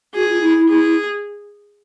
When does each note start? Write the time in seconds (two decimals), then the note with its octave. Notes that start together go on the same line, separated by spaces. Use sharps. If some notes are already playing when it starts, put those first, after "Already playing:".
0.15 F#4 G#4
0.28 F4
0.41 E4
0.55 E4
0.68 E4 G#4
0.81 E4